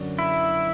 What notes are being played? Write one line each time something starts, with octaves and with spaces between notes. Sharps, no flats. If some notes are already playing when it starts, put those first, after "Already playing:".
Already playing: F#2 D3 F#3
E4